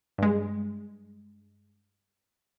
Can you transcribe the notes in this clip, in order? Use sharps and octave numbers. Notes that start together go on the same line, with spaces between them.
G2 G#3